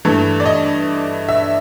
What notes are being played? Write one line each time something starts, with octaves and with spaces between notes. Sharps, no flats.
G2 E3 A3
D5
D#5
E5